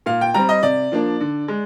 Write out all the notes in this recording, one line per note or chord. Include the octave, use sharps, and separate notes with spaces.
A#2 F5
G5
G3 C4 A#5
D#5
C3 D5
F3 A#3 D4
D3
G#3